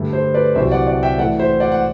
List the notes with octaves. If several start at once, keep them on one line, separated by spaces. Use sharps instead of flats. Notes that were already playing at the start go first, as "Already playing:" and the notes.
Already playing: G2 D3 A3
C5
B4 D5
C2 C3 F#3 C5 E5
D5 F#5
D5 F#5
E5 G5
A2 E3 A3 D5 F#5
C5 E5
D5 F#5
F#5